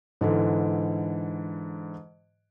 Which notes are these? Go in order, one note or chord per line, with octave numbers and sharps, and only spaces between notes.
G#2 D3 E3